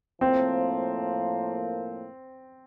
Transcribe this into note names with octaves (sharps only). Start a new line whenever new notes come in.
A2 F3 A#3 C4